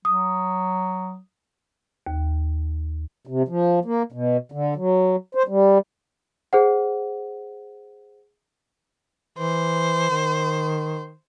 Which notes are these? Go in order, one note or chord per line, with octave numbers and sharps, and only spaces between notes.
F#3 D#6
D#2
C3
F3
A#3
B2
D3
F#3
C5
G3
G#4 C5 F#5
E3 C5
D#3